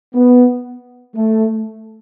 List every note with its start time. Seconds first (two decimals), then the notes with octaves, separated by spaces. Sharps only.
0.14 B3
1.15 A3